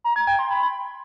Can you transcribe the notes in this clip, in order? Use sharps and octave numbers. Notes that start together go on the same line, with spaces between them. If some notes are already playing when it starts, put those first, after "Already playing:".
A#5
G#6
G5
C6
B5